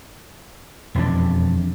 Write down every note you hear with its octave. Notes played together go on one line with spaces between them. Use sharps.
E1 F2 F3 D4